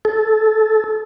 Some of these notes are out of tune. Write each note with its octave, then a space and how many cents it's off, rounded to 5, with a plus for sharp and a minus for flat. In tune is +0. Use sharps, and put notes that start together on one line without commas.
A4 -20